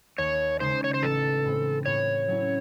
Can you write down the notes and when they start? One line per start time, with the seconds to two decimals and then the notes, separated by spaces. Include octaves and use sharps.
0.18 D#2 C#5
0.60 C#3 G#3 D#4 C5
0.84 C#5
0.94 C5
1.02 A1 A4
1.45 A2 G#3 C4
1.86 A2 C#5
2.28 F#3 C#4 E4